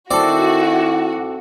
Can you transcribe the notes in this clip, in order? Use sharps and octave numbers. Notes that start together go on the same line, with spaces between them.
D#3 C4 E4 F#4 A4 D5